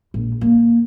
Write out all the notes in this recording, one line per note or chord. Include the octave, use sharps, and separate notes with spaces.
A#1
A#3